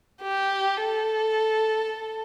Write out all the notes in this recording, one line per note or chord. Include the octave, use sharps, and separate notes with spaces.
G4
A4